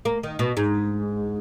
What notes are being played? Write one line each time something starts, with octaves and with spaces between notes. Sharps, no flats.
A#3
D#3
B2
G#2